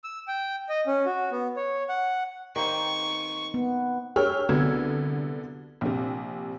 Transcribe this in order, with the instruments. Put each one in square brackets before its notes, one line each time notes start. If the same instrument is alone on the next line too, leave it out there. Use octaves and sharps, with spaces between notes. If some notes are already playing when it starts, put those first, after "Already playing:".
[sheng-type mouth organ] E6
G5
D#5
C#4
F#4
B3
C#5
F#5
[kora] D#3 A#3 C4 [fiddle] C#6
[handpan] B3
[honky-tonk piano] G4 G#4 A#4 C#5 E6 F6
C2 D3 F#3 B3 E6 G#6
A#1 C3